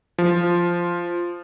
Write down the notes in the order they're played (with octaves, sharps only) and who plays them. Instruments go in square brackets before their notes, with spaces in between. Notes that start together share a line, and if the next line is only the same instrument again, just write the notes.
[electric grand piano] F3